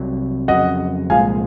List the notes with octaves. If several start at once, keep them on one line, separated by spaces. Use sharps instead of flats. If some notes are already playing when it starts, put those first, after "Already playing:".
Already playing: C2 C3 F#3
F2 C#3 F#3 D#5 F#5
C2 A#2 F3 G#3 F5 G#5